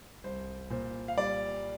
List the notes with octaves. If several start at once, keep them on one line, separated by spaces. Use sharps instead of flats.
C2 C5
A#2 C5
F5
G3 D5